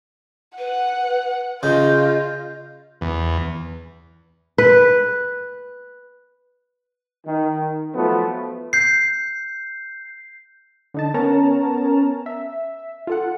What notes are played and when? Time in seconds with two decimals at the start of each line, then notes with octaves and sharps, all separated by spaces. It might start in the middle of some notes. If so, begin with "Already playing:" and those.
0.58 B4 F#5
1.63 C#3 F4 D#5 G6
3.01 E2
4.58 B4
7.25 D#3
7.94 F3 F#3 A3 B3 F4
8.73 G6 C7
10.94 D3 D#4 A5
11.14 B3 C#4 A#4 C#5 A5 A#5
12.26 E5
13.07 F4 A4 F#5